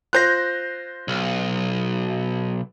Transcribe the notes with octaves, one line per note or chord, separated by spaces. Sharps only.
F4 C5 F#6 G6 A#6
B1